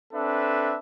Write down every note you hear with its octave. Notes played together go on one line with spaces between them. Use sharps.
C4 D4 A4 B4 E5